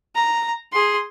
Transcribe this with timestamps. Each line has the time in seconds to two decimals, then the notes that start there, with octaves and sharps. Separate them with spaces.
0.15 A#5
0.72 G#4 C6